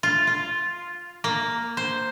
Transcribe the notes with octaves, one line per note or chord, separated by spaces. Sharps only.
F4
F4
A#3
C5